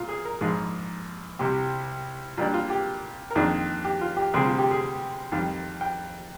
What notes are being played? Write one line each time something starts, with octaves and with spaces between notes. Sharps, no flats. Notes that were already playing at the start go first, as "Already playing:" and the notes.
Already playing: A#2 F4
G#4
A#4
A#1 G#2 F3 G#4
C2 C3 G3 C4 G4
A#2 G3 D4 F4
F4
G4
A#4
F2 D#3 A#3 D4 G#4
G4
F4
G4
D2 C3 G3 C4 G#4
F4
G4
G#4
F2 D#3 G3 F5
G5